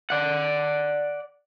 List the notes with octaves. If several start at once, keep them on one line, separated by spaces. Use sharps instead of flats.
D5 F#5